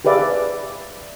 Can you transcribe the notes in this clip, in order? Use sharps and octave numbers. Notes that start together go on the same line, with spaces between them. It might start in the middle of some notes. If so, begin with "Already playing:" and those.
G4 G#4 B4 D5 E5 F5